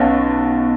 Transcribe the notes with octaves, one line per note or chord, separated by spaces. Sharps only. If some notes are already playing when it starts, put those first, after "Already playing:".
Already playing: B1 B2 C#4